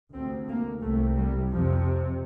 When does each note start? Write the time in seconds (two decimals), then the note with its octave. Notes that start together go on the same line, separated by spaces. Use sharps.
0.14 D2 C3 C4
0.48 A#3
0.82 C2 C3 A3
1.16 G3
1.51 F2 C3 F3